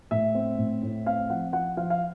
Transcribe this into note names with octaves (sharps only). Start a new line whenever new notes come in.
A2 E5
C4
A2
A2
C4 F5
F3 F#5
F3 F#5
F3 F5
F5